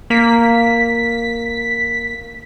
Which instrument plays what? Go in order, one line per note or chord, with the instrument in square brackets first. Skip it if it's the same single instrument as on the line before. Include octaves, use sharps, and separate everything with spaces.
[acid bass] A#3 [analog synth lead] B6